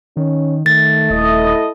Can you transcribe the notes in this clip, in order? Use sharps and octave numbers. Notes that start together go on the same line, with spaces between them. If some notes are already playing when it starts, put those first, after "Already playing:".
D#3 C#4
D#3 A3 A6
D#1 E4 A4 D#5